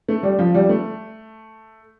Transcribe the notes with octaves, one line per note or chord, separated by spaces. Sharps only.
A3
G3
F3
G3
A3